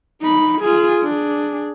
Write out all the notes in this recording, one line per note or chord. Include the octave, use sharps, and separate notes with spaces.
D#4 B5
F4 G#4
D4 G#4